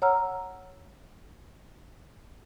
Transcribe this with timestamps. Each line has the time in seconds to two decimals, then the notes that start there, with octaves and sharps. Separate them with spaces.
0.02 C#5 F#5 A#5 E6 F6